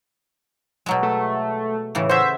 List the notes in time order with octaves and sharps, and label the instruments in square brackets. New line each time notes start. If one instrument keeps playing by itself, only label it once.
[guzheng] B2 F#3 G#3
[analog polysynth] A3
[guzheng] A2 C#3 E3
[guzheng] F#4 G#4 [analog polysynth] C5 E5